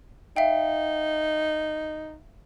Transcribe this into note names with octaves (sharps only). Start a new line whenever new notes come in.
D#4 E5 F5 G5